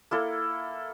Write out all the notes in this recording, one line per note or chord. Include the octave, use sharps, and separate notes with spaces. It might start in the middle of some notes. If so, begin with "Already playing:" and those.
A#3 E4 A4